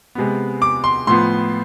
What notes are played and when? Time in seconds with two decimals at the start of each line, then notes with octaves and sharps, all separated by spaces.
0.15 C3 G#3 B3
0.62 D6
0.84 C6
1.07 A2 F3 B3 C6